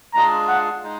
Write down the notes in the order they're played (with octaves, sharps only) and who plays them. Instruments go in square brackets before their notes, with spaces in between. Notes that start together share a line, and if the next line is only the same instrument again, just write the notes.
[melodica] G#3 D4 F4 G#4 [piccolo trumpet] A#5
[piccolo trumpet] F#5
[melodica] G#3 D#4